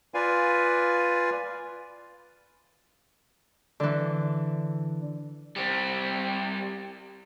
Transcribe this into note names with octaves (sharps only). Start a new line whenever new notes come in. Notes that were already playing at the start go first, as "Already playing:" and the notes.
F4 B4 D5 F5 G#5
D3 E3
G3 C4